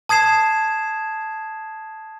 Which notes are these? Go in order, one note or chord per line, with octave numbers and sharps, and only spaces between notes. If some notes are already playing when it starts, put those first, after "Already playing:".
A5 D#6 G#6 C7 E7